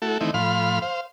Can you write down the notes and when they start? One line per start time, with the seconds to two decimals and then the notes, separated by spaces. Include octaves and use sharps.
0.02 A3 E4 F#4 A4
0.21 D#3 E3 A3 C4 D#4 E4
0.34 A2 F3 F5 B5 C6 F6
0.82 C5 F5